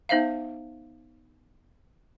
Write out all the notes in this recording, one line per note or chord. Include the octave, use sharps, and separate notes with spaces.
B3 D#4 C5 E5 F5